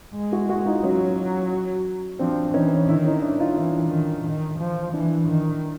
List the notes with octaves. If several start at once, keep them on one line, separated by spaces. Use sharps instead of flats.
G#3
E4 F#4
E4 F#4
D#4 F4
F#3 C#4 D#4
F3 C4 D4
E3 C#4 D#4
D#3 D4 E4
C#4 D#4
D4 E4
D#4 F4
E3 D4 E4
D#3
D#3
F3
E3 D4 E4
D#3